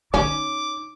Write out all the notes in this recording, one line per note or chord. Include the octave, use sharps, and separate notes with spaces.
C#4 D#4 D6